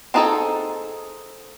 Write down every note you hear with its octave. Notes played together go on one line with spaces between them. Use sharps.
C4 D4 D#4 G#4 A4